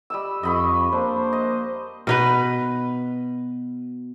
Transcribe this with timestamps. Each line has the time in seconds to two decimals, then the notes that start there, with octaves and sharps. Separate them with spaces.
0.10 G3 D#5 E6
0.43 F2 D#5 B5 C#6
0.92 A#3 D4 C5
1.33 D#5
2.07 B2 D#4 B4